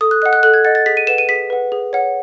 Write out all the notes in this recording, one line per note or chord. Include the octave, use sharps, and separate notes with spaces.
A4 D#6
F#6
D#5 F#5 F#6
F#6
A4 F#6
G#6
D#5 F#5 A6
A6
G#4 B6
D#7
B4 F#5 E7
D#7
G#4 B6
B4 F#5
G#4
C#5 F#5